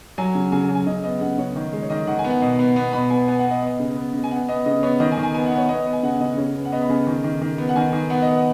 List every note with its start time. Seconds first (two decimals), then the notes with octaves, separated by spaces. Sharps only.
0.18 F#3 G#5
0.35 C#3
0.52 C#3 G#5
0.64 G#5
0.69 F#3
0.75 G#5
0.87 C#3 D#5
1.04 B3 D#5
1.21 C#3 F#5
1.38 C#3 C#5
1.56 D#3
1.73 G#3
1.82 C#5
1.90 D#3 D#5
2.07 D#3 F#5
2.19 G#5
2.24 B3
2.30 F#5
2.42 B2
2.59 B3
2.76 B3
2.93 B2 B5
3.10 B3 G#5
3.28 B3 G#5
3.39 F#5
3.45 B3
3.51 D#5
3.62 B3
3.80 C#3
3.96 B3
4.14 C#3
4.24 G#5
4.31 B3 F#5
4.49 B3 D#5
4.66 C#3 D#5
4.83 B3 C#5
5.00 D#3 D#5
5.12 G#5
5.18 D#3
5.23 G#5
5.34 B3 G#5
5.46 F#5
5.52 B3
5.58 C#5
5.69 B3 D#5
5.86 B3
5.93 G#5
6.03 C#3 F#5
6.21 C#3 D#5
6.38 C#3 C#5
6.55 B3
6.65 F#5
6.72 B3 D#5
6.82 B5
6.89 C#3 G#5
7.07 D#3
7.24 D#3
7.41 D#3
7.58 B3
7.69 F#5
7.76 D#3 G#5
7.93 D#3
8.10 B3 F#5
8.22 D#5
8.27 B3 F#5